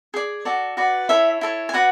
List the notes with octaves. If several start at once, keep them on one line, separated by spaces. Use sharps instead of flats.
G#4 D5
F#4 A4 D5
F#4 B4 D5
E4 A4 C#5 E5
E4 A4 C#5
G#5
F#4 B4 D5 F#5